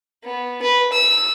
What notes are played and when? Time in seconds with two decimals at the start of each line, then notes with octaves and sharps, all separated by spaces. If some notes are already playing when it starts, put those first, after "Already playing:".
0.24 B3
0.62 B4
0.93 E6